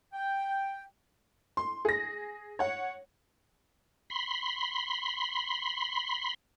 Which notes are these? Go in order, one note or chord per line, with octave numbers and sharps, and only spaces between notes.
G5
C6
G#4 A#6
C#5 F#5
B5 C6